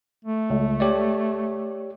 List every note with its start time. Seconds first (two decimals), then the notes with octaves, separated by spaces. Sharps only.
0.24 A3
0.50 C#2
0.80 G4 C#5 D5